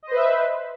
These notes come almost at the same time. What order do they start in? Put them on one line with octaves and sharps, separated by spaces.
D#5 C5 B4 E5